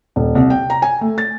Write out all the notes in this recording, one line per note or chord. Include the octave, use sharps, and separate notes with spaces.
D#1
C2
G5
A#5
G#5
A3
A6